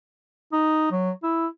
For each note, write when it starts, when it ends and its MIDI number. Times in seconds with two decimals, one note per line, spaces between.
0.53 0.89 63
0.92 1.11 54
1.23 1.47 64